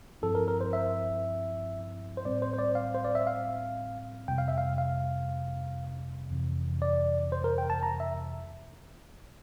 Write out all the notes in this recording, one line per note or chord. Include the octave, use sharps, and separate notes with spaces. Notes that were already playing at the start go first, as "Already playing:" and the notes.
G2 F3 C4 E4 A4
A#4
A#4
C5
E5
C5
A2 G3 C4 D5
C5
C5
D5
F5
C5
D5
E5
F5
F2 C3 G3 G5
F5
E5
F5
F5
F2 C3 E3
D5
C5
A#4
G5
A5
A#5
E5